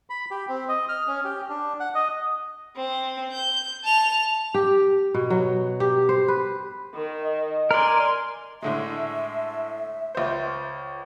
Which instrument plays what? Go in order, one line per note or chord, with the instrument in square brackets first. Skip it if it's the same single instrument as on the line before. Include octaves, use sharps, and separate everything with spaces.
[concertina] B5
G4
C4
D#5
F6
C#4
G4
D4
F#5
D#5
[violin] C4
G6
A5 F7
[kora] G4
B2
F#3
G4
C5
B4
[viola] D#3
[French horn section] D#5
[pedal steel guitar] A#4 D5 [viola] G#5 C6
[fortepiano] A2 D3 G#3 [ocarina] E5
[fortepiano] C#2 C5